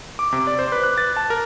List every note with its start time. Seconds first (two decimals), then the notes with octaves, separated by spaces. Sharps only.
0.19 D6
0.33 C3
0.47 D5
0.59 C5
0.72 B4
0.84 F#6
0.98 A6
1.17 A5
1.30 A#4